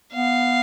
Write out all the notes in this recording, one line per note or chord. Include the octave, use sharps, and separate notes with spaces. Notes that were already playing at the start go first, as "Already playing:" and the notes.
B3 F5